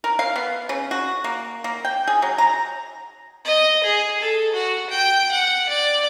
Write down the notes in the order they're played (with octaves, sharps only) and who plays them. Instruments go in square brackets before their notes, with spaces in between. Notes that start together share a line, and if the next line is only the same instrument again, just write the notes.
[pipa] A#4
F5
B3
C#3
F#4
A#3
A#3
G5
G#4
F#3
A#5
[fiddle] D#5
G#4
A4
F#4
G5
F#5
D5